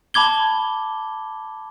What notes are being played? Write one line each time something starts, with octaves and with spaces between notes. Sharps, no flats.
A5 B5 D6 G#6 G7